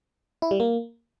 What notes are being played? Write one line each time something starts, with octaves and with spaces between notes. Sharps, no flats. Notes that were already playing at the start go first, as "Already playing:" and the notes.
E4
G3
A#3